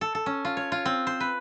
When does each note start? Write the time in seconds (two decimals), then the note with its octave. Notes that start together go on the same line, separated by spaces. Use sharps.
0.01 A4
0.15 A4
0.26 C#4
0.45 F4
0.57 C#5
0.72 F4
0.85 C4
1.07 C5
1.20 B4